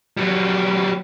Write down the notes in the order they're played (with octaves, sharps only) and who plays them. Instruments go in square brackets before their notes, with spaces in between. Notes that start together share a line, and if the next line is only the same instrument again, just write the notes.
[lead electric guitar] F#3 G3